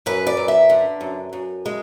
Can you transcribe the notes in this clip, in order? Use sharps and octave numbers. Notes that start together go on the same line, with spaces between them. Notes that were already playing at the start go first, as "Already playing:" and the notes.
F#2 B4
D5
F#2
E5
D3
F#2
F#2
G#3